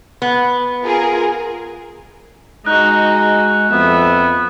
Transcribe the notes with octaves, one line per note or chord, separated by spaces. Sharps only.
B3
F4 G#4 A#4
G#3 D#4 F#4 F#6
F2 B3 E5